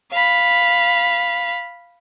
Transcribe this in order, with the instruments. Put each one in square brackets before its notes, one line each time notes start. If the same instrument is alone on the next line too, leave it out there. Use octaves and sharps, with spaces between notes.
[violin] F5 B5